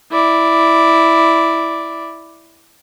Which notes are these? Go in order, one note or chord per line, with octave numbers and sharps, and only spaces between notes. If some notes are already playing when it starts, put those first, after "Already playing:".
E4 D5